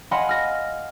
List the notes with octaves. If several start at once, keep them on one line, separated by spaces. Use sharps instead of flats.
D#5 F5 F#5 G#5 B5 C6
F6 A#6